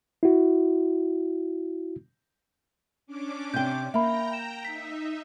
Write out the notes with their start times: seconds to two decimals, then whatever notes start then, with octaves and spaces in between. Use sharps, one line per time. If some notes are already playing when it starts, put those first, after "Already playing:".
0.23 E4 F#4
3.07 C#4 D4 D6
3.54 C3 G5 G6
3.94 A#3 E5 G5 A#5 B5
4.33 E7
4.65 D#4 E5 B6